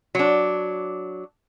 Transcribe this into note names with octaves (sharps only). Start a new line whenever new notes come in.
F#3 D4